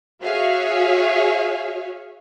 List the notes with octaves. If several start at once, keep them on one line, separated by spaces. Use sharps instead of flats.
F#4 G#4 C#5 E5 F5